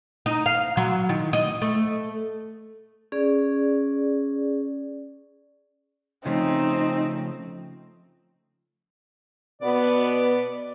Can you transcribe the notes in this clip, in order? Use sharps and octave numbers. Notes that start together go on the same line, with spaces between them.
D#4
F5
F#3
D#3
D#5
A3
C#4 G#4 D5
C#3 F3 A3 C4 D#4
B2 B3 D5